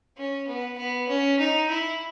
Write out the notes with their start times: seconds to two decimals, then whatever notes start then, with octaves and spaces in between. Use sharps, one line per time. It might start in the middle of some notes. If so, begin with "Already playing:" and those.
0.17 C#4
0.47 B3
0.78 B3
1.08 C#4
1.39 D#4
1.69 E4